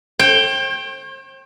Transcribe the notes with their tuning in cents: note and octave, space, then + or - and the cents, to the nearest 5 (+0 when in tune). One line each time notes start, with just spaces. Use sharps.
C5 +45 G5 +0